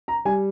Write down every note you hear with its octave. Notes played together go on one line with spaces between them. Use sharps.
A#5
G3 G#5